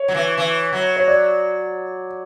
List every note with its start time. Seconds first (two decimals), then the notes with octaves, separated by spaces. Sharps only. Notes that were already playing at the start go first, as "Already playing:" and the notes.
Already playing: C#5
0.08 F#3
0.15 E3
0.38 E3
0.73 F#3
0.96 C#5
1.08 D5